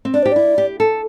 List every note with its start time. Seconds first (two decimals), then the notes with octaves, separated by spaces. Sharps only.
0.05 C4
0.14 D4 D5
0.23 G4 C5
0.32 E4 D5
0.58 G4
0.80 A4